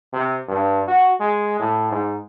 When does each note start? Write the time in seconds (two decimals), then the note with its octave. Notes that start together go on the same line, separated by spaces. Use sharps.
0.13 C3
0.48 G2
0.88 F#4
1.20 G#3
1.60 A2
1.91 G#2